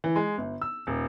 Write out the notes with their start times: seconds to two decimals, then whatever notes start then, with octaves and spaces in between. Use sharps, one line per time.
0.04 E3
0.16 G#3
0.38 G1
0.62 E6
0.87 D#1